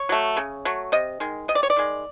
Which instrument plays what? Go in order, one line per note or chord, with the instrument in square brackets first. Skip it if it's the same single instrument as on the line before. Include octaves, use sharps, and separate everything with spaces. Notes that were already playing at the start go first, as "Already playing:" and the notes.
Already playing: [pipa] C#5
F#3 A3
C#3
F#3 A3
C3 D#5
D#3 G#3
C3 D#5
D5
C#5
D5
D#3 G#3